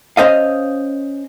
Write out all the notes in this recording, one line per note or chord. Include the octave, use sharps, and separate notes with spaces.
C#4 C5 D#5 F5